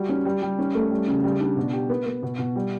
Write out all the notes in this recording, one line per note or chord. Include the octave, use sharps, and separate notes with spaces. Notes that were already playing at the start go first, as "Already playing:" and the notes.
Already playing: G3 F#4
C#4
G3
G3
C#4
A3
G3
C#3
G3
D4
B2
G4
B3
B3
B2
B2
G3